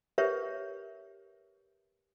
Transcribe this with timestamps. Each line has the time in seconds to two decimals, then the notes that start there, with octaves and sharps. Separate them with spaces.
0.18 G4 A#4 B4 C#5 E5